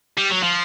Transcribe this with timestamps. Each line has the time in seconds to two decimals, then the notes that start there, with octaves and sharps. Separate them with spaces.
0.18 G3
0.31 F#3
0.43 F3